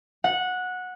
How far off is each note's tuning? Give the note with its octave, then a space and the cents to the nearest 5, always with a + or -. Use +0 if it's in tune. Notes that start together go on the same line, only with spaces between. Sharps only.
F#5 -15